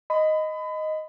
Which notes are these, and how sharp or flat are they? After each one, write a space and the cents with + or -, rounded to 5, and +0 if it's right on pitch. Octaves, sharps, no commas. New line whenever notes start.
D#5 +0 B5 +30